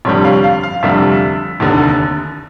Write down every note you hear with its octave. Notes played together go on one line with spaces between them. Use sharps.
F1 F2 D3 G3 C#5
F5
F5
F5
F1 F2 D3 G3 E5
F1 D#2 D3